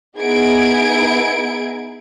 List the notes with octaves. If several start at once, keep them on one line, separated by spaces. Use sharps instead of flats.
B3 D#4 E4 G#4 G#6 D7